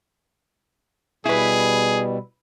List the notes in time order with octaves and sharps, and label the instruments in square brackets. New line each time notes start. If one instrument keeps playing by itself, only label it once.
[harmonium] B2 G3 [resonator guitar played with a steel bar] E4 B4 [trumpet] G#4